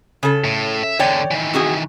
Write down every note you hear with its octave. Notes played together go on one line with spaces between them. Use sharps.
C#3 A4
A2
E5
E2 D3 C#5 D5 G5
D#3 E3
C4 F#4 G#4